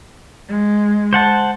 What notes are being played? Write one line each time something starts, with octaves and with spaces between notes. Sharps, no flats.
G#3
C5 F#5 A5